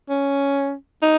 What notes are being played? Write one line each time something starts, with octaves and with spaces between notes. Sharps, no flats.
C#4
D#4